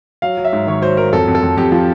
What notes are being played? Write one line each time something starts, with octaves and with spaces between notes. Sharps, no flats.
F#3 F5
F#3
E5
G#2
D#3 C#5
F#3 C5
F#3 A#4
F2 A4
F2
A4
F2
F2 G4
F3